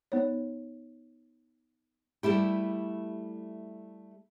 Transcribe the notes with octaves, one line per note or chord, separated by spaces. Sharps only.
B3 D#4 C5 C#5
G3 A3 E4 G4